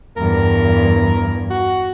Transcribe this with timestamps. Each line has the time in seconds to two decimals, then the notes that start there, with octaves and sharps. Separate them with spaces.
0.17 E2 G2 A#4
1.50 F#4